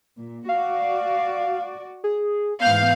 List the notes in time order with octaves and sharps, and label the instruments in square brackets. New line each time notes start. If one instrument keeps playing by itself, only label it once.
[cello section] A#2
[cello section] F#4 D5 [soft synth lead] F5
[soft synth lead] G#4
[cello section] G#2 E3 B3 [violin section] F5 [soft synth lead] G6